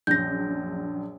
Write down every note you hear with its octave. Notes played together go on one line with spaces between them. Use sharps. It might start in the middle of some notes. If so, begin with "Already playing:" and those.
A#1 F#2 G6 A#6